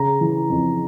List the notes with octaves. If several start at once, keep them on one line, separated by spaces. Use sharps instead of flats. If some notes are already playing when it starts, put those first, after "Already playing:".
Already playing: C#3 A#5
E3
F2